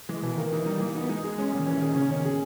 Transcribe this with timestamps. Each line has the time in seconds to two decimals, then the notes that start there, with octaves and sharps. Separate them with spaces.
0.09 E3 G#3
0.23 B2 E3
0.37 D#3 A#3
0.52 E3 D#4
0.66 G3 D#4
0.80 E3 A#3
0.95 B3 D#4
1.09 G#3 D#4
1.24 G#3 G#4
1.38 G#3 C#4
1.52 A#2 G3
1.59 D#3
1.67 E3 C#4
1.81 D#3 G#4
1.95 C#3 C#4
2.11 D#3 C#4
2.25 G#4